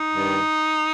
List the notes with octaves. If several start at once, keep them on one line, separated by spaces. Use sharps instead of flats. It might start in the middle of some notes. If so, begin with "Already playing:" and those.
Already playing: D#4
G2 D#3